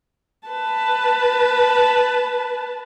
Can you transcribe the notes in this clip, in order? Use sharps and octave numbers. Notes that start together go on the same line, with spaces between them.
B4 A5